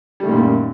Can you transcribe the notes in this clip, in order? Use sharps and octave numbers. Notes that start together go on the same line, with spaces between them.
F#2 A#2 D#3 G3 A3